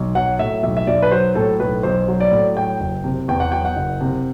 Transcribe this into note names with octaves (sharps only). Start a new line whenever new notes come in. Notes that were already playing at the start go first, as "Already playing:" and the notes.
Already playing: B1
F#3 F#5
A2 E5
B1 E5
E5
B1 D5
B4
F#3 C5
A2 A4
B1 B4
B1 C5
F#3
D5
A2
F#3 G5
F#1
C3
E2 G5
F#5
F#3 G5
F#5
F#1
C3